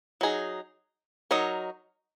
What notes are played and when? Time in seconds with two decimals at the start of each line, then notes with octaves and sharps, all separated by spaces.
0.21 F#3 D#4 G#4
1.31 F#3 D#4 A#4 C#5